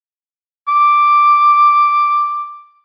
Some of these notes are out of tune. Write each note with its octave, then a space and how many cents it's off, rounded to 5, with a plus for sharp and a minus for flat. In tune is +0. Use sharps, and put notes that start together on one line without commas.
D6 +5